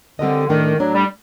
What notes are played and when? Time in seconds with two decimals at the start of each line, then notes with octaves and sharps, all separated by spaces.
0.19 D3 G3 C4 G4 A#4 D#5
0.49 A2 D#3 A3 D4
0.79 A2 F#3 A3 D4
0.94 G3